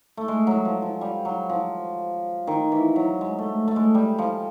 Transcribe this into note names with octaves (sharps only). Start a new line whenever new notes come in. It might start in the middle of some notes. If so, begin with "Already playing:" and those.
A3
G#3
F#3
F3
F3
G3
F#3
F3
D#3
E3
F#3
G#3
A3
A3
G#3
G3
F3